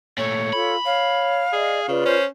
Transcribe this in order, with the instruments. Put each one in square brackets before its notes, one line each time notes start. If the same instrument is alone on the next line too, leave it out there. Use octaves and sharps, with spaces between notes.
[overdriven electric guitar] A#2 A3 [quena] C#5
[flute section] F4 A4 [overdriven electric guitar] B5
[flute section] C#5 [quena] F5
[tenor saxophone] G#4 [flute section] D5 D#5
[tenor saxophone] C#3 [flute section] F4 B4 D5
[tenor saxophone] C#4 [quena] C5